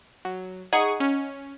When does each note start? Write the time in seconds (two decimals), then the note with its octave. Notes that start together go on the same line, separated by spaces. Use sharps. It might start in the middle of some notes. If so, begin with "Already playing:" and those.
0.25 F#3
0.73 D#4 G#4 F#5 C#6
1.00 C#4